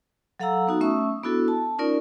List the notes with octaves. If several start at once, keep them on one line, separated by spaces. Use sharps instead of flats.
F#3 A4 F5 F#5 A#5 E6
B3 D#4 F#4
A3 C#4 E5 C#6 D#6 E6
B3 D4 E4 F#4 A4
A5
C#4 D#4 F4 A#4 D5